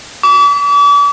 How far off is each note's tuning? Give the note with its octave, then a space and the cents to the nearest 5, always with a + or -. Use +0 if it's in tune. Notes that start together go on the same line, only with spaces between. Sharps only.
D6 -40